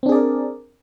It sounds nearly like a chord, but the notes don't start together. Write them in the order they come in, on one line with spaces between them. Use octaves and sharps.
C4 D4 G#4 D5 A#4